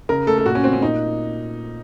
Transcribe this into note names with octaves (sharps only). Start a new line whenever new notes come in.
C#3 A#4
A3 A4
A4
A#2 F#4
C#4
A3 C4
C#4
A#2 D#4